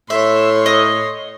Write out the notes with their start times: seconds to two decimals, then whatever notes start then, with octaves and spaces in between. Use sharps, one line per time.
0.10 A2 C#5 E5 C6
0.66 D#5